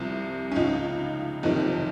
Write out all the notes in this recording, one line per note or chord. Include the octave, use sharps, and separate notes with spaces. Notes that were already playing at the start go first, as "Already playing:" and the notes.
Already playing: C2 C3 F3
C#4
C#2 C#3 F3 D#4
F#1 F2 C3 D#3 D#4